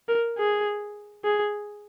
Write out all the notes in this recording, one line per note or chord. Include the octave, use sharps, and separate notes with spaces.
A#4
G#4
G#4